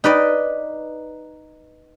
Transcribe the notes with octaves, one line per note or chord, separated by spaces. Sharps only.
D#4 B4 D5 D#5